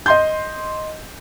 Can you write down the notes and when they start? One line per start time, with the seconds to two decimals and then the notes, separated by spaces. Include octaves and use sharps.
0.06 D#5 C6 G6